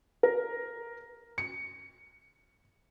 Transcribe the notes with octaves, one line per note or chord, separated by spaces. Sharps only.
A#4
C#7